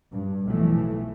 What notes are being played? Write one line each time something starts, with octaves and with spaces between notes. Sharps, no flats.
G2
B1 A2 E3 F3 A3